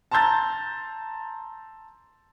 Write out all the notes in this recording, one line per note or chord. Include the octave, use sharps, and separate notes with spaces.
A5 A#5 C6 E6 G6 A6